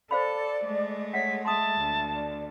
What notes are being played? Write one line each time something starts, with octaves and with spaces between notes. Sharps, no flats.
A4 C5 D5 F5 B5
G#3 A3
C#5 E5 F#5 B6
E5 A5 C6 D#6
D2
D5